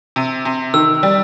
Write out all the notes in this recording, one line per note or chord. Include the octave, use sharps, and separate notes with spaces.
C3
C3
D#3 E6
G3